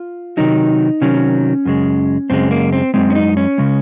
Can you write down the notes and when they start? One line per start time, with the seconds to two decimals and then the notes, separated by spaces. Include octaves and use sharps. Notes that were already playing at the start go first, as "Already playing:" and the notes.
Already playing: F4
0.37 C3 D#3 F#3 D#4
1.01 C3 D#3 F#3 C#4
1.65 F#2 C#3 G#3
2.30 F#2 C#3 G#3 C4
2.51 A#3
2.73 C4
2.94 F#2 C#3 G#3 C4
3.10 C#4
3.15 D#4
3.37 C#4
3.58 C#3 G#3